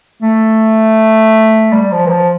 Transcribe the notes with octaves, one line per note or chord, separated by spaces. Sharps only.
A3
G3
F3
E3
F3